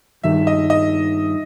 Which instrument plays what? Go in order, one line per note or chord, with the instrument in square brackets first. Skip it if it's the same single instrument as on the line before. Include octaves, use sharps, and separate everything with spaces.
[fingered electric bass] G2 D#3 G3 [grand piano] E5
[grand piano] D#5
D#5